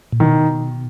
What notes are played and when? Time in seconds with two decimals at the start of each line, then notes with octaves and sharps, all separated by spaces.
0.12 A#2
0.20 B2 D#3